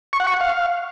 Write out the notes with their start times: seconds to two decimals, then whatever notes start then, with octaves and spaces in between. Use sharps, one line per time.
0.13 C#6
0.20 F#5
0.27 C#6
0.34 F#5
0.41 F5